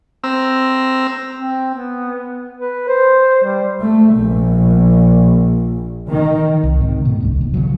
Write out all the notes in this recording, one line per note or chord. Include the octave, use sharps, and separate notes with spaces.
C4 A#5 E6
C4
B3
B4
C5
G3
A3
A#1
D#3
C2
G#2 C3 D#3
B2 A3
D1 C2 G2
D#1 D#2
B1 C#3 F3 F#3